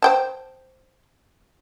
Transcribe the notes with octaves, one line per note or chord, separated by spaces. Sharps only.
C5 G5 A5